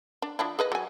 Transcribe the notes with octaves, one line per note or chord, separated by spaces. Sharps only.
D4
F3 D4 E4
G#4 B4 D#5
F#3 G#5